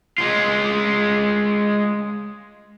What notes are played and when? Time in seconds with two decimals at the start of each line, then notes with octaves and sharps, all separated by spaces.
0.18 G#3 F4